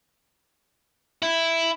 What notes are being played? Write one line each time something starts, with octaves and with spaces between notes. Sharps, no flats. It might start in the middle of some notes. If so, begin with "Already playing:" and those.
E4